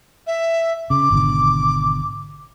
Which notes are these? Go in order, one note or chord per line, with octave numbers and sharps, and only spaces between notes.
E5
C#3 D6
G#1 B2 D3